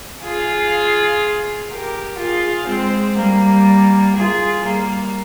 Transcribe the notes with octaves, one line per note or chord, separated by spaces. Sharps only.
F4 G#4
G4 A#4
F4 G#4
G#3 C4
G3 A#3
F4 G#4
G3 A#3